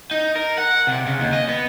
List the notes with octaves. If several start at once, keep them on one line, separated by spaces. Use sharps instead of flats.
D#4
A#4
F#5
C3
C#3
D#2
D#5
B3